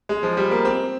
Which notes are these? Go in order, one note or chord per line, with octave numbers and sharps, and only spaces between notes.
G#3
F3
G3
A#3
C4